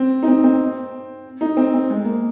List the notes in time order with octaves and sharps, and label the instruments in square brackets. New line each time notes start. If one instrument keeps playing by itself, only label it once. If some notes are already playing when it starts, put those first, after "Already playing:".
Already playing: [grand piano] C4
D#4
C4
C4
D#4
C4
C4
G#3
A#3